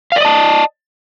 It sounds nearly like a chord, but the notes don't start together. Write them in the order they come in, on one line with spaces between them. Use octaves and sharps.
F5 D5 D#5 A5